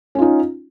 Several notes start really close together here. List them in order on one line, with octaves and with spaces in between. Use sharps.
C#4 F4 D#4